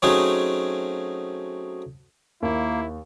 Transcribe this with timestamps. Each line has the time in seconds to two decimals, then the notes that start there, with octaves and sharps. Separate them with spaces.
0.02 F#3 A3 C4 C#4 D#4 G#4
2.42 D#2 A#3 E4